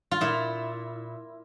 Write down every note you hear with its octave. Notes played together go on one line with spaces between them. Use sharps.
F4
A#2 E4